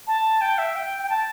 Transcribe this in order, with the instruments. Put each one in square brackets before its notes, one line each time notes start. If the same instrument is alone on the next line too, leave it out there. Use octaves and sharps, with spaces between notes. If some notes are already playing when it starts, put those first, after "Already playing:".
[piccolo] A5
G5
E5
G5
G5
A5